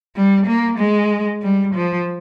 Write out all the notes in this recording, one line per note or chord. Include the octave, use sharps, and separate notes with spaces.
G3
A#3
G#3
G3
F3